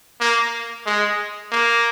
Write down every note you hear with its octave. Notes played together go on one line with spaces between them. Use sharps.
A#3
G#3
A#3